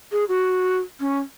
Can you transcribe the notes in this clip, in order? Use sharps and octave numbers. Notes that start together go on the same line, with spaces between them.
G#4
F#4
C#4